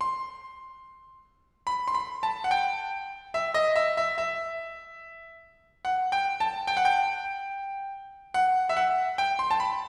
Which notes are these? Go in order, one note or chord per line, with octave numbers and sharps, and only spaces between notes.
C6
B5
C6
B5
A5
F#5
G5
E5
D#5
E5
E5
E5
F#5
G5
A5
G5
F#5
G5
F#5
E5
F#5
G5
C6
A5
B5